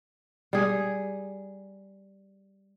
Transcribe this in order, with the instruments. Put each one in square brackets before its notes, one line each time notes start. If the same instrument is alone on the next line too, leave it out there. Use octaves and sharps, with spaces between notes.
[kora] G3 G#4